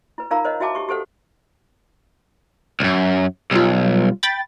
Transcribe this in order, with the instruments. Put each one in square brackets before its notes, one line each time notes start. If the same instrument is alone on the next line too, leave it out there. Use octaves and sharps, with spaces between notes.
[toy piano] E4 B4
D#4 F4 A#4 F5 A#5
A#4 C5 C#5 D#5 F#5
E4 F#4 E5 G5 A5 D6
G4 C#6
G4 A4 C5 F#5
[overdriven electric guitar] C2 F#2
[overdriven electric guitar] B1 [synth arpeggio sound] G3 F4
[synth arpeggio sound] G5 B5 A6